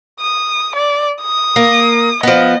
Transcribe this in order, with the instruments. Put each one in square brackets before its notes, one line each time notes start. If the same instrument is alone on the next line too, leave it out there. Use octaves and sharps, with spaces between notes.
[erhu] D#6
D5
D#6
[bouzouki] A#3
[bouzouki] F3 B3 [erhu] D#5